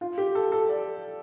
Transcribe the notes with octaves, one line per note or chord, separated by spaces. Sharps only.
F4
G4
A4
A4
D5